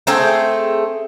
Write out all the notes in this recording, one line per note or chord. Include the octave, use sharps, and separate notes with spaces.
A3 C4 G#4 G5